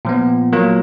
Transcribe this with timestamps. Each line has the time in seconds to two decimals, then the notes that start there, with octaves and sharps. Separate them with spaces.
0.05 A#2 F3 B3
0.53 F#3 A#3 F4 A#4